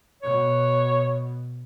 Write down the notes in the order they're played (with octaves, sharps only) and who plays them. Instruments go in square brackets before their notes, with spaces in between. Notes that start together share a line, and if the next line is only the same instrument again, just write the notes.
[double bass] B2 [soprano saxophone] C#5